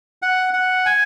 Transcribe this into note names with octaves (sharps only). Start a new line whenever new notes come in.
F#5
F#5
G#5